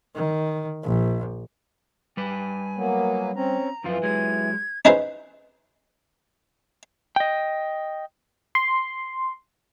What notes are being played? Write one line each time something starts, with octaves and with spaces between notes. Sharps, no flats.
D#3
A#1
G3 B4 G#5
F#3 A#3 B3
C4 C#4 A#5
F#2 E3 F3 F4
F#3 G#3 G#6
C#4 D#4 E4 G#4 B4 C5
D#5 G5
C6